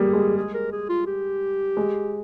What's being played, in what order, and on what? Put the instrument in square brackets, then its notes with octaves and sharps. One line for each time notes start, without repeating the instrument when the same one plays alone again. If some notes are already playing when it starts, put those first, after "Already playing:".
Already playing: [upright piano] G3 A#3 [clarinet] G#4
[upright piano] G#3
[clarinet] G#4
A#4
G#4
F4
G4
[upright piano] G#3